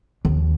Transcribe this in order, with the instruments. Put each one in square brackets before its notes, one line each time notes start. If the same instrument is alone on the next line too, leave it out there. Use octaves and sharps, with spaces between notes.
[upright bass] D#2